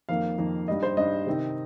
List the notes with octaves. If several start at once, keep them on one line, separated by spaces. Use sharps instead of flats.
F2 D#3 A#3 F5
F2 D#3 A#3
G2 G3 D#4 D#5
C5
G2 G3 D#4 D#5
C3 D#3 C4 D#4